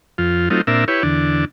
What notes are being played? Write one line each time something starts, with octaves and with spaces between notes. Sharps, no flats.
F2 F4
F#3 A3 C4 D#4 F4
A#2 C4 D4 A#4 E5
E4 G4 B4 C#5
E2 D3 D4